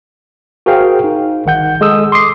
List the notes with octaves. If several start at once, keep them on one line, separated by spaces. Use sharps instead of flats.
F#4 G#4 A#4 C5 F5 G5
D#4
G1 D#3 F#5 G6
G#3 A4 D#6 E6
C6 D6 D#6 C7